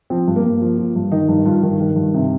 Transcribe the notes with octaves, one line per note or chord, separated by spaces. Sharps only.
F3 C4
G2
A#3
G2
F3
F3
G2
D#3 D#4
G2 D#4
G2 F4
D#3
D#3
G2
C3